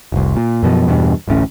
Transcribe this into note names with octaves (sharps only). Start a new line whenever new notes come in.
F1 C2
A#2
F#2 B2 E3 F3
E2 G2 B2
D1 A1 A2 C#4